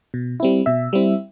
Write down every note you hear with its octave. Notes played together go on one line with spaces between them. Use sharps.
B2
G3 C4 E4
B2 E5
G3 C4 E4